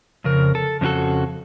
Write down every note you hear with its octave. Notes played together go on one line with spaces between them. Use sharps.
F2 C#3 A#4
A4
F2 C#3 C4 F#4 A4